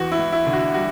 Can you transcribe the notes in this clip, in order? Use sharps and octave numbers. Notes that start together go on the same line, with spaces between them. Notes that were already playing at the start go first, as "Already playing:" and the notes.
Already playing: E2 F#4
E4
E2
E4
D3
F#4
G3 F#4